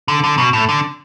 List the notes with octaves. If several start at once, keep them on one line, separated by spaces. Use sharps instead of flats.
D3
D3
B2
A2
D3